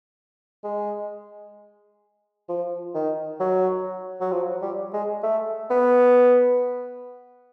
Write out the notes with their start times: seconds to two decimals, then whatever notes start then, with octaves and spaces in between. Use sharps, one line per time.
0.64 G#3
2.49 F3
2.94 D#3
3.40 F#3
4.21 F#3
4.32 F3
4.62 G3
4.94 G#3
5.23 A3
5.70 B3